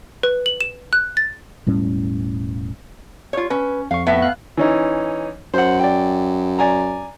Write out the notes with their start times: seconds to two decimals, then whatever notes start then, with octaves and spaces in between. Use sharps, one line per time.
0.23 B4
0.46 F#7
0.61 E7
0.93 F#6
1.17 A6
1.66 E1 A2 G3 C#4
3.33 F4 C#5
3.50 C#4 B4
3.91 F2 F5 C#6
4.06 A2 B3 E5
4.22 F5 F#6
4.57 E3 C#4 D#4
5.54 F#2 C5 F#5
5.79 D5 G5
6.59 D5 G#5 A#5